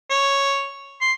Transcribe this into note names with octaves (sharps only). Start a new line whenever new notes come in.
C#5
C6